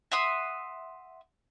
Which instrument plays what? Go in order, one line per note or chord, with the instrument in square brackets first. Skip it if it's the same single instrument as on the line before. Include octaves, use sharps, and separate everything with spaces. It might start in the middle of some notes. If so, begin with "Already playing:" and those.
[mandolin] E5 F#5 C6 D#6